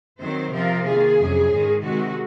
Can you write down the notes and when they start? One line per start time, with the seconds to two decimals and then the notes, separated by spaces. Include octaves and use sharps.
0.20 D#3 F#3 C4 C5
0.52 C3 F3 C4 F4 A#4
0.85 D#3 A#3 F4 G#4
1.17 F2 C3 F#3 C#4
1.50 G#2 D#3 G#3
1.83 C3 D#3 G#3 C4 F#4